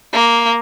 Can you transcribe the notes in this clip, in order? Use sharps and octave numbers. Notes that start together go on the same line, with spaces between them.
A#3